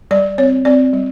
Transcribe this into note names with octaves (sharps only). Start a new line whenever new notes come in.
G3 D5
C4 C#5
C4 D5
G3